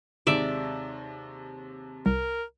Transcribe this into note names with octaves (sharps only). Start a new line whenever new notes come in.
D#2 C3 G#3 D5 E5
C2 A#4